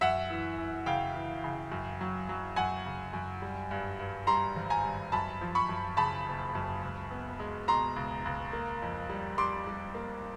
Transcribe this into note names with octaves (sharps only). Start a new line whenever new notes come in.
F#2 E5 F#5
E3
E3
C#3 F5 G5
E3
C#3
F#2
F#3
F#3
F#2 F#5 G#5
C#3
F#2
G3
G2
G2
G3 A#5 C6
G#1
G#5 A#5
G2
F#2 A5 B5
F3
B5 C#6
F#2
C#3 A5 B5
F#1
F#2
C#2
B3
G#3
B2 A#5 C6
C#2
C#2
A#3
F2
G3
G3 C6 D6
G3
A#3